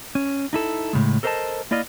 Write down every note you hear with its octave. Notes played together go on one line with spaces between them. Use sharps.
C#4
D#4 E4 A4
A2 C#3 G#3
A4 A#4 C5 D5 D#5 A5
A#3 E4 D5 D#5 F5